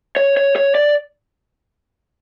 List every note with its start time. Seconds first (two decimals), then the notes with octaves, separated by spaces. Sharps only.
0.16 C#5
0.37 C#5
0.56 C#5
0.75 D5